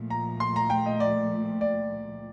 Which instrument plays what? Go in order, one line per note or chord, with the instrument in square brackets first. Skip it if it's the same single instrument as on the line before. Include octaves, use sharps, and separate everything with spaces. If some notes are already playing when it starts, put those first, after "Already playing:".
Already playing: [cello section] A#2 F3 A3
[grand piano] A#5
C6
A#5
G5
D#5
D5
D5